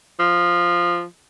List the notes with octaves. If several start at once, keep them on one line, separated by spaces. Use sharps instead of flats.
F3